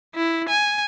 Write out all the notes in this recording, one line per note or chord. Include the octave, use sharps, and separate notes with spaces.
E4
G#5